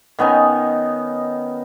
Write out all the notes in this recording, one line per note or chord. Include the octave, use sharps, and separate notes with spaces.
D#3 B3 C#4 D#4